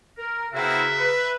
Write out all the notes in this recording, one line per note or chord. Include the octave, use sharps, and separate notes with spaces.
A#4
C#3 B3 C4 E4 F#4 A#4 E5
B4